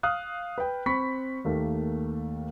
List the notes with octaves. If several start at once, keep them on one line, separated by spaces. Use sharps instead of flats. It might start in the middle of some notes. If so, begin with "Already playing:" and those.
F5 D#6 F6 F#6
B4 G5
C4 B5 C#6 B6
D#2 D#3 A3 A#3